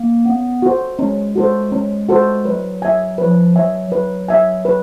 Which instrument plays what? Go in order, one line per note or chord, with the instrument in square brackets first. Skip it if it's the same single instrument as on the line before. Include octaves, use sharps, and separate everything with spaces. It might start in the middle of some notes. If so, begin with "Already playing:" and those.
Already playing: [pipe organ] A#3
[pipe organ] B3 [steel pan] C#4
[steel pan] F#4 A4 C5
[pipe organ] G#3 [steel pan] C#4
[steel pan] F#4 A4 C5
C#4
F#4 A4 C5
[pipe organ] F#3 [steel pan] B4
[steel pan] E5 G#5
[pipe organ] F3 [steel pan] B4
[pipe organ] F#3 [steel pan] E5 G#5
[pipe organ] F#3 [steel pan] B4
[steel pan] E5 G#5
B4